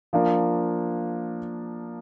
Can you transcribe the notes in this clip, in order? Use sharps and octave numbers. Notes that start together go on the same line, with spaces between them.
F3 A#3 D4